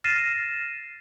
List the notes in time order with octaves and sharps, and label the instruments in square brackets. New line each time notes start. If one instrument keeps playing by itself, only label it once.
[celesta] F6 A6 A#6 C7 D#7 E7